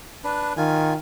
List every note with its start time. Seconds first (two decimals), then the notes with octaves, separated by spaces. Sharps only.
0.24 D4 B4
0.57 D#3 F4 G#5